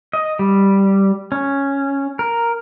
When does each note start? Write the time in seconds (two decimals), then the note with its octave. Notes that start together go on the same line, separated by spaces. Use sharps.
0.13 D#5
0.39 G3
1.32 C#4
2.19 A#4